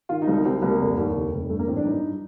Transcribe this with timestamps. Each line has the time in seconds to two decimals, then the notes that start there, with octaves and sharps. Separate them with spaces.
0.09 D#3 F4
0.22 D#4
0.27 C2
0.34 D#4
0.45 C2 C4
0.62 C2 A#3
0.80 F1
0.98 D#2
1.15 F1
1.32 F1
1.50 G2 A3
1.59 A#3
1.67 A1 C4
1.76 D4
1.85 G2 D#4